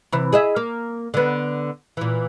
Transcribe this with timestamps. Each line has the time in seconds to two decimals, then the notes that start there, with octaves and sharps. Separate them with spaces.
0.12 C3 E3
0.33 G#4 D#5 E5
0.56 A#3
1.14 D3 B3
1.97 A#2 E3